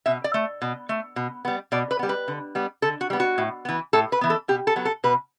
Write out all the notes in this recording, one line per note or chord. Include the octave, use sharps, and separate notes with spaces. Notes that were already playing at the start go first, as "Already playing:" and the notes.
B2 E5
D5
A3
B2
A3
B2
G3 B3
B2 D5
B4
G3 B3
B4
D3
G3 B3
D3 A4
F#4
G3 B3
F#4
A2
E3 B3
A2 A4
B4
E3 B3
A4
B2 G4
A4
F#3 B3
A4
B2 B4